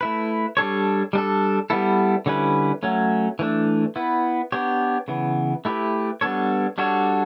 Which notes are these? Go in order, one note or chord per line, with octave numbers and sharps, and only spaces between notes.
A3 E4 B4
G3 D4 A4 C#5
G3 D4 A4
G3 B3 E4 A4
D3 G3 C#4 E4 B4
F#3 A3 C#4
E3 A3 D4
B3 E4 B4
B3 D4 G4 C#5
C#3 E3 B3
A3 E4 G4 B4
G3 B3 D4 A4 C#5
G3 D4 F#4 A4 C#5